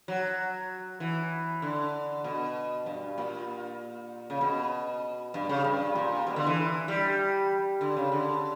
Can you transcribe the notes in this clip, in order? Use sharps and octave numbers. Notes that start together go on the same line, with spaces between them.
F#3
E3
D3
B2
G2
A#2
C#3
B2
G2
C#3
G2
A#2
B2
D3
E3
G3
D3
C#3
D3